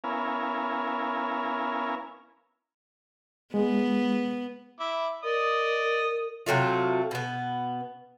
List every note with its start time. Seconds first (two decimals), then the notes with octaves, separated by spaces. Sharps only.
0.04 B3 C#4 E4 A#4 F5 G#5
3.54 G#3 B3
4.80 E4 D6
5.23 A#4 D5 D#5 D#6
6.46 C3 F#3 A3 F4
7.11 B2 B3